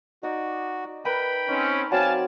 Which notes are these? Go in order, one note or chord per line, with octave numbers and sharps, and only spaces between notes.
D#4 F#4 D5
A#4 B4 G5 B5
C4 C#4 D#4
F#3 C4 D5 F5 G#5 A5